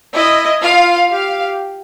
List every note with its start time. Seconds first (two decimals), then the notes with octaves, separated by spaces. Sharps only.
0.13 E4 D#5
0.61 F4 F5
1.10 G4 F5